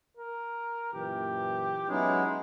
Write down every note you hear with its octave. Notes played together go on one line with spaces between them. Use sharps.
A#4
F#2 A#2 E3 G4
F#3 G#3 B3 C#4 D#4 E4